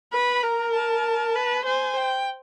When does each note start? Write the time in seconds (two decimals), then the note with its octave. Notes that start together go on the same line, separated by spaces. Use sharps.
0.13 B4 B5
0.43 A#4 A#5
0.74 A5
1.36 B4
1.66 C5 G#5
1.97 G5